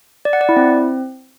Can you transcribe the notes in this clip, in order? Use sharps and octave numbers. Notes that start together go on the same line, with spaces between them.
D5
F#5
D5
E4
C4